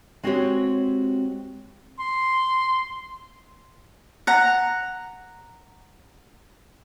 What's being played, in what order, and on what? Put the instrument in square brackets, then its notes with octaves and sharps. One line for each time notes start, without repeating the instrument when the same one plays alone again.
[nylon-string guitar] G#3 C4 F#4 G4 C5 C#5
[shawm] C6
[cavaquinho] F#5 A#5